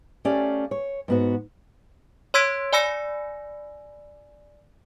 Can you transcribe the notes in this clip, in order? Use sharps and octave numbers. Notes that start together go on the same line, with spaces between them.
A3 C#4 G4 D5 F5
C#5
G#2 B3 F#4
C#5 C6 E6 G#6 B6 D7
D5 G#5 B5 E6 A#6 C#7